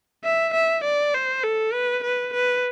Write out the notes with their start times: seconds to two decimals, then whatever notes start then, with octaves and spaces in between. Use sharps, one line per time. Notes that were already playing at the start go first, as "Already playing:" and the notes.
0.24 E5
0.54 E5
0.84 D5
1.14 C5
1.44 A4
1.73 B4
2.03 B4
2.34 B4